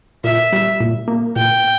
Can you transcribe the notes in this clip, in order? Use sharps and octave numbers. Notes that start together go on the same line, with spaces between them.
A#2 E5
G3
A#2
A#3
A#2 G5